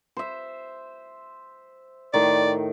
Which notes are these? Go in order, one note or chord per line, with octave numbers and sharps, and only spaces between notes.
C5 E5
A2 D#3 D5